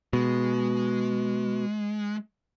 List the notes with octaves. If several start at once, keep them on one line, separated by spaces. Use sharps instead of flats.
B2 G#3